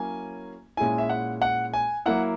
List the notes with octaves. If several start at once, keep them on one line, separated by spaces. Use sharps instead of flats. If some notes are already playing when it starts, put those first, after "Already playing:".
Already playing: F#3 A#3 C#4 E4 G#5
A#2 G#3 C#4 E4 G#5
E5
F#5
F#5
G#5
F#3 A#3 E4 F#5